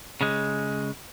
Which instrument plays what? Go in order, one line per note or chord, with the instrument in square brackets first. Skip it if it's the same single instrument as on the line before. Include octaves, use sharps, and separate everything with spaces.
[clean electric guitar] C#3 G#3